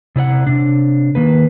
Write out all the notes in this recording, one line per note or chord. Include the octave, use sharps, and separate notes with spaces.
C3 E4 D5 F#5
C3 D4
D#3 A#3 B4